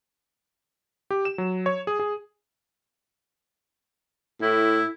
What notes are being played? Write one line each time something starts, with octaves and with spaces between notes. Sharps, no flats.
G4
E7
F#3
C#5
G#4
G#4
A2 E4